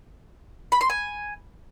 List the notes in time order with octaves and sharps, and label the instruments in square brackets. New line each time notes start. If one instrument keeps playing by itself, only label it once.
[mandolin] B5
C6
G#5